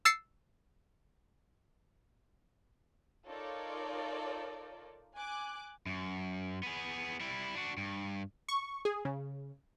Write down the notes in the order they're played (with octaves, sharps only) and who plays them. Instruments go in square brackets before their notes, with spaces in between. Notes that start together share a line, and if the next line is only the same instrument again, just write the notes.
[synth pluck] E6 A6 C7 C#7
[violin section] D#4 F4 A4 A#4 C#5 D5
G#5 D6 F#6
[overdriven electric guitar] F#2
B3 G#4
G3 E4
D4 F#4
G2
[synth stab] C#6
G#4
C#3